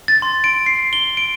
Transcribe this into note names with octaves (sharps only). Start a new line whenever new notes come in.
A6
C6
D7
C7
G7
D7